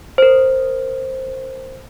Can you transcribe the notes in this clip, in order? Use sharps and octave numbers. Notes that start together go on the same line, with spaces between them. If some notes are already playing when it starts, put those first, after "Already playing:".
A#4 C5